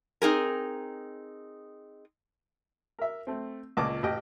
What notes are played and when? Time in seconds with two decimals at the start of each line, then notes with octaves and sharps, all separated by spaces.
0.22 C4 D#4 G#4 A#4
2.99 A#4 E5
3.27 A3 C4
3.77 C#2 A#2 D#5 A5 D6
4.03 A1 G4 D#5 G5